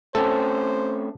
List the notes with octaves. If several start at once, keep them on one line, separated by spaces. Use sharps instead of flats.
A3 C4 C#4 A4 C5